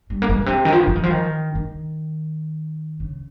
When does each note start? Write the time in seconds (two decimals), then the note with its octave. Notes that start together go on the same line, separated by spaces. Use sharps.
0.10 G3
0.22 A#3
0.29 G#3
0.39 A#2
0.46 C3
0.65 D#3
0.72 F3
0.80 D#3
0.87 F3
0.96 D#3
1.03 F3
1.10 D#3
1.55 D#3
3.00 C#3